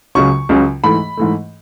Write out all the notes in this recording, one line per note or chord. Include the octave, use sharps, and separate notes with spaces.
C#2 C#3 F#3 C#4 C#6
C#2 C#3 F#3 C#4
G#2 E3 A3 B5
G#2 E3 A3